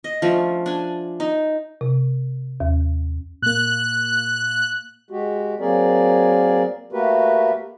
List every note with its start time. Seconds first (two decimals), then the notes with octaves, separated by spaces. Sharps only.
0.04 D#5
0.22 F3 A3 C#4 D4
0.66 D4 G#5
1.20 D#4
1.81 C3
2.60 D#2
3.42 A#2 A#3 F#6
5.11 G#3 F#4 G4
5.60 F#3 A#3 C4 G#4 A#4 D5
6.93 A3 A#3 F#4 G4 A#4 B4